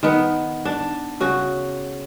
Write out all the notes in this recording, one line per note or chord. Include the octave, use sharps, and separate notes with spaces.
D#3 B3
D4
C#3 F#4